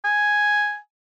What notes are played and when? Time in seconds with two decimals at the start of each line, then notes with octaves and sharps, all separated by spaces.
0.05 G#5